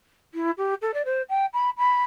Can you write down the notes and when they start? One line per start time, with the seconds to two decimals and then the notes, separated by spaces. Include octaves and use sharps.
0.34 E4
0.57 G4
0.82 A4
0.94 D5
1.05 C5
1.29 G5
1.53 B5
1.77 B5